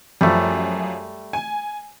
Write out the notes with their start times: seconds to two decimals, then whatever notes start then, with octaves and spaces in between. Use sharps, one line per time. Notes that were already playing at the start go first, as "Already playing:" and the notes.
0.21 F#2 F3 G3 A3
1.33 G#5